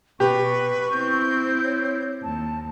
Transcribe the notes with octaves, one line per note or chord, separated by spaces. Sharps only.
B2 G4 B4 C#6
C4 E4 G6
C#5
D#2 A5